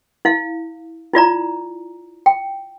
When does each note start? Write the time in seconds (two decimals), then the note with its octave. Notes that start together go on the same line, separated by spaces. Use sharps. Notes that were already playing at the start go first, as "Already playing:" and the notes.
0.25 E4 F5
1.13 E4 F4 D5 A#5
2.26 G5